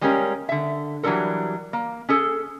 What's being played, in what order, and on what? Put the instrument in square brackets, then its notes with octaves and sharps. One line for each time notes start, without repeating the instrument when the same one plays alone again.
[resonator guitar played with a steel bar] G3 G#3 A#3 C#4 G4 A#4
D3 E5
E3 F#3 G3 D4 A4 A#4
A#3
C#4 G#4 A4